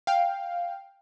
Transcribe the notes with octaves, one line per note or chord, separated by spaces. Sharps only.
F5 G5